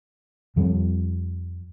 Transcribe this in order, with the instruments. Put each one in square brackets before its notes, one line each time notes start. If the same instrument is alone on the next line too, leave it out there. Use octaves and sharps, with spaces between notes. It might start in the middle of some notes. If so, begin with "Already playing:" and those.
[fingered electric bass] F2 F3 G3 C4